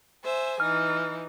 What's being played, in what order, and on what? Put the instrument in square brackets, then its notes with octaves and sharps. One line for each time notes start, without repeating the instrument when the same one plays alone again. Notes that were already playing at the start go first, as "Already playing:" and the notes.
[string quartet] C5 E5 G#5
[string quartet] E3 D#4 [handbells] F6